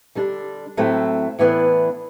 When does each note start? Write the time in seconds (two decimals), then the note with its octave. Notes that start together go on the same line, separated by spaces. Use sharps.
0.15 D3 G3 D4
0.77 A2 F#3 A3 C4
1.39 A2 E3 B3 D4